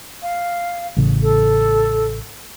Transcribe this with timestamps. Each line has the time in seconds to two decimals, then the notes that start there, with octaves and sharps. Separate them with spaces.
0.22 F5
0.97 A1 A2 C#3
1.23 A4